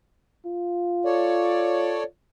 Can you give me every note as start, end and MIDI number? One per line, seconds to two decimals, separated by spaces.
0.46 2.08 65
1.05 2.03 69
1.05 2.03 73
1.05 2.03 74